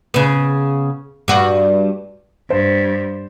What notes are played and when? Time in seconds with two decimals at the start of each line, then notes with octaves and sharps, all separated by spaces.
0.14 C#3 B3
1.28 G2 F#4
2.50 G2 C5